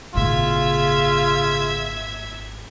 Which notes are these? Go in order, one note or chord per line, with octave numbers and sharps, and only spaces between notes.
G#1 A#2 C#3 F4 E5 G#6